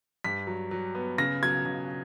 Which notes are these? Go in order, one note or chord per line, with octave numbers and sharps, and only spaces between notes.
G2 B6
F#3
F#3
B3
C#3 A#6
F#3 G#6
C#3